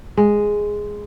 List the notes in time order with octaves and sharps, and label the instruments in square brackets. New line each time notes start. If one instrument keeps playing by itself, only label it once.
[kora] G#3